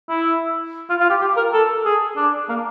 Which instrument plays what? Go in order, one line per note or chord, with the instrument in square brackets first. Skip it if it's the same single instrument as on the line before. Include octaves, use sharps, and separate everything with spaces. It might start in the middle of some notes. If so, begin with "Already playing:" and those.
[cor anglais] E4
F4
F4
G4
G4
A#4
A4
G#4
D4
A#3